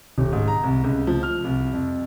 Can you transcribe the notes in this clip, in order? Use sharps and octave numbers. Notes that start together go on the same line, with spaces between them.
D#1
G#2
A#5
C2
C#2
F3
F6
C2
F2